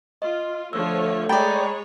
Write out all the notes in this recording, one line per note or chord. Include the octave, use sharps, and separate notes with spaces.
F4 D#5
D3 F3 A3 C#5 E6
G#3 G#4 C#5 D5 G5 A#5 B5 A6